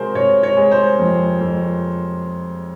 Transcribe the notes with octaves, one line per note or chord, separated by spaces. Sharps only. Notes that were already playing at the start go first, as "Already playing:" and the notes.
Already playing: C3 G#3 F#4 A#4 C5
C3 C#5
C#5
G#3
C5
F2
F2